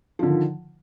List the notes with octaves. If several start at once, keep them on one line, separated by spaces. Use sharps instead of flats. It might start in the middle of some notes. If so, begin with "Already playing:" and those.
D3 D#3 F3